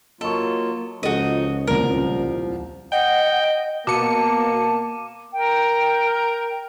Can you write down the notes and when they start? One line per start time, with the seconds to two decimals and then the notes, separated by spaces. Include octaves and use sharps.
0.21 F#3 A#3 F4 A4 D#5 C#6
1.03 C#2 F3 D#4 F#4 G#4 A4 D#5
1.67 D#1 C2 F3 A#4
2.92 D#5 F#5 G5
3.87 B2 A#3 A5 D6 C#7 D#7
5.33 A#4 G5